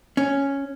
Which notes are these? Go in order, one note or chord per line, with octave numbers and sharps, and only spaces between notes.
C#4